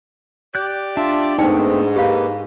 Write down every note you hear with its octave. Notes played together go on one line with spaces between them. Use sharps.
G4 D5 F#6 G6
D4 F4 E5 A5
G#2 A3 B3 C4 D#4 D5 G5
A#3 G4 B4 F5